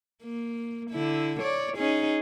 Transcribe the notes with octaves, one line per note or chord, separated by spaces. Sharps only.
A#3
D3 E4
C#5 D5
C#4 D#4 G#4